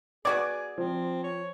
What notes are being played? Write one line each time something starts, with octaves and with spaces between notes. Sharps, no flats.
B3 F#4 G#4 D5 D6 D#6 G#6
F3 C4
C#5